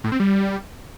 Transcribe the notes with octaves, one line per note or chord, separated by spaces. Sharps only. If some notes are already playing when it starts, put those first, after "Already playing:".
A2
C4
G3